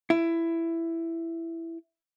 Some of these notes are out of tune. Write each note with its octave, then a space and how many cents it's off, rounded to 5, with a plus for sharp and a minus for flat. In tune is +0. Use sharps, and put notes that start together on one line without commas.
E4 +10